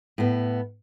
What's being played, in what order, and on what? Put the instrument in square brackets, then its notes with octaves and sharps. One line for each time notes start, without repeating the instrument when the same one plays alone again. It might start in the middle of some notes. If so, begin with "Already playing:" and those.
[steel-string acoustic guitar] A2 B3